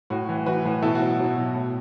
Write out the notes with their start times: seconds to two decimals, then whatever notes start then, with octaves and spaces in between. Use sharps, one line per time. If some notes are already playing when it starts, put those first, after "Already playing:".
0.10 A2 F#4
0.29 E3
0.46 E3 F#4 B4
0.65 A2
0.82 B2 E4 A4
0.95 F#4
1.01 F#3
1.07 F#4
1.19 F#3
1.37 B2
1.55 A2